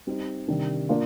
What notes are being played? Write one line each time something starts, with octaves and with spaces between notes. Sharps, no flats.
G3 C4 D#4
C3 D#3 G3 D4
A#3 D4 F4